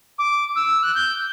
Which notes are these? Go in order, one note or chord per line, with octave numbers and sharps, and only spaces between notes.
D6
E6
F#6
G6